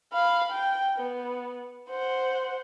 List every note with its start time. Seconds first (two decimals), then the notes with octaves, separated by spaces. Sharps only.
0.13 F5 B5
0.52 G5
0.99 B3
1.90 C5 F#5